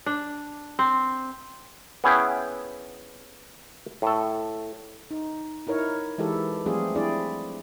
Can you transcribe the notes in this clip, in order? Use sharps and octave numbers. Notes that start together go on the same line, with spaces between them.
D4
C4
B3 C#4 E4 G#4 B4 G5
A2 A4
D#4
D#4 E4 A#4 C#5
E3 G#3 E4 G4 A4
F3 G3 A3 C4 F4 G#4
C4 D4 E4 G#4 D5